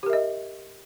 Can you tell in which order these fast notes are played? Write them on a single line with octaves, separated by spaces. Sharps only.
G4 A#4 E5 D#5